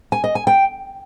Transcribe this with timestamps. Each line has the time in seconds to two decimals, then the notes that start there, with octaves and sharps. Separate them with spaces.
0.12 G#5
0.24 D#5
0.35 G#5
0.47 G5